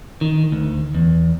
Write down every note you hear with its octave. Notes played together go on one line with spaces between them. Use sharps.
D#3
D2
E2